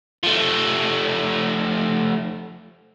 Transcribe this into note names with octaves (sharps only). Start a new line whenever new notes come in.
F3 A3